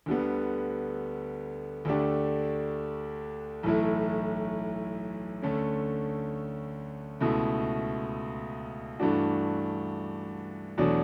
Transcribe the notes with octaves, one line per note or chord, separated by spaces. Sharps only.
D2 D3 G3 B3
D2 D3 A3 D4 G4
B1 A2 E3 A3 E4
D2 D3 A3 C#4
C#2 B2 A3 E4
G2 E3 A3 D4 F#4
E2 B2 F#3 A3 D4